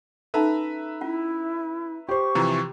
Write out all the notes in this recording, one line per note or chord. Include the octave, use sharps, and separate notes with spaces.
C#4 D#4 A4 B4 E5 A#5
C#4 E4 F4
G4 C5 C#6
C3 E3 F3 F4 A#5